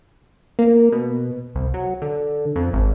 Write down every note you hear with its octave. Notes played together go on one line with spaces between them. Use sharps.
A#3
B2
C2
F#3
D3
F2
G#1